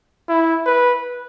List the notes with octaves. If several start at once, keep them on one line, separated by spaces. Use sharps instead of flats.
E4
B4